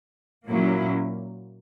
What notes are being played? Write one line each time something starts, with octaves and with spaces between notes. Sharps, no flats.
A#2 F#3 A#3 C#4 E4